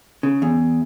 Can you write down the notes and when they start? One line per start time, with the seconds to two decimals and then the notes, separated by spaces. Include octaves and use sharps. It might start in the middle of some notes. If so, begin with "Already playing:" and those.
0.23 C#3
0.42 E2